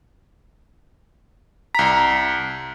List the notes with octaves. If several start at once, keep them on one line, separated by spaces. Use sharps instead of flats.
C2 A#5 B6